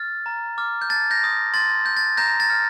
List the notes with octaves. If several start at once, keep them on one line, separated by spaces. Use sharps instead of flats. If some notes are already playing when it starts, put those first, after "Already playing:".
Already playing: F6 A6
A#5
D6 F6
G6
A5 A6
G6 A#6
C6 D#6 G6
C6 A6
G6
A6
A#5 G6 A#6
A6
F6